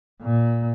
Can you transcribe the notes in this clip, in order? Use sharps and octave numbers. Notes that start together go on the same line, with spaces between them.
A#2